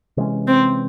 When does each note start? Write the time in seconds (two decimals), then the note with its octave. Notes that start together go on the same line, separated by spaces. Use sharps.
0.17 C3 E3 G#3 C#4
0.47 C4